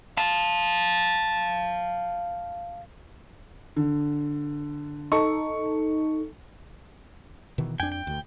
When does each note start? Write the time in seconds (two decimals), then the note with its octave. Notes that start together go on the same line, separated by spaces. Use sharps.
0.17 F5 A5
3.76 D3
5.12 D#4 A4 C#6
7.58 B2 D#3 E3
7.80 F2 D4 G5 G#5
7.92 G5
8.07 D2